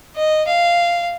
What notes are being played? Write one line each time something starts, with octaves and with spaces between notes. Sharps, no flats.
D#5
F5